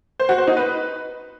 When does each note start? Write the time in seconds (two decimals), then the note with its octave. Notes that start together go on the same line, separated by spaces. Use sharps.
0.20 C5
0.29 F#4
0.38 C5
0.47 D#4
0.57 B4